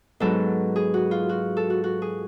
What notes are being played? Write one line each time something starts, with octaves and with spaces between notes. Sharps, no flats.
G#2 F#3 B3 A4
G#4
F#4
F4
F#4
A4
F#4
F#4
G#4